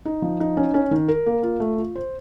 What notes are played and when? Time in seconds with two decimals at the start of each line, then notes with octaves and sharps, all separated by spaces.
0.05 D#4
0.22 F3
0.40 D#4
0.57 C#4
0.74 C#4
0.91 D#3
1.08 A#4
1.26 A#3
1.43 F4
1.60 A3
1.78 F4
1.96 C5